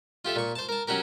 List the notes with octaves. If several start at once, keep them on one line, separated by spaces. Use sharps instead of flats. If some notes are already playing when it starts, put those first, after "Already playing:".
F4 G4 A4 E5
A#2 C#6
C5 A5
A#4 A5
F#3 C#4 F#4 G4 A#4